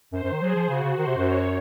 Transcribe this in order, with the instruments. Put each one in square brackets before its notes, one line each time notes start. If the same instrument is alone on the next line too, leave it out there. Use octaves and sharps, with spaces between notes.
[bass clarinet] F#2 [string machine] C5
[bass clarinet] F#2
D#3
[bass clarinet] F#3 [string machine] G#4
[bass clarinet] F3
[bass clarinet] C#3 [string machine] F#4
[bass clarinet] C#3
[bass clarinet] D#3 [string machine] C5
[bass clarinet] C3
F#2
[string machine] C#5